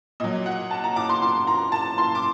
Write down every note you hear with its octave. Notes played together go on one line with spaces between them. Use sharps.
A#2 F#3 D#5
F#5
A5
A#5
D6
C6
C6
A#5
A5
C6
D6